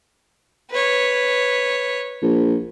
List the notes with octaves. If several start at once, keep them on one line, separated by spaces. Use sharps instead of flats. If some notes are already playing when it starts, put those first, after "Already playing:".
B4 C#5
A#1